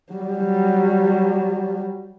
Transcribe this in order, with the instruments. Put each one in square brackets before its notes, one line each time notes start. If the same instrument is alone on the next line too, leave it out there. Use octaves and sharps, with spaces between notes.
[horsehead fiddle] F#3 G3